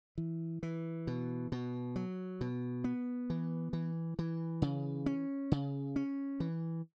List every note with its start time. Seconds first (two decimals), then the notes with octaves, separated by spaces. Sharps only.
0.18 E3
0.63 E3
1.07 B2
1.52 B2
1.96 F#3
2.41 B2
2.84 B3
3.30 E3
3.73 E3
4.19 E3
4.62 C#3
5.06 C#4
5.52 C#3
5.96 C#4
6.40 E3